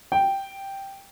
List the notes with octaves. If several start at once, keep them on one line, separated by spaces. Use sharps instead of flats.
G5